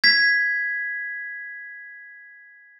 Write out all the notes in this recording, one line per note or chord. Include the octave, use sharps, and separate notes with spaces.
G#6 B6